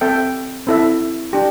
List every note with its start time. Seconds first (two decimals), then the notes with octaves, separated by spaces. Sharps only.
0.01 C4 A4 E5 G5
0.67 C4 E4 A4 E5
1.33 D4 G4